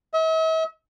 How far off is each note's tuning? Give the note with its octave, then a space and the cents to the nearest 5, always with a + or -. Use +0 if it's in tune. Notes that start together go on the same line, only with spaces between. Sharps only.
E5 -45